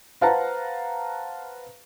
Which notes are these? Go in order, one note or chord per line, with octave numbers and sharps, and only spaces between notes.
B4 C5 F5 F#5 A5 A#5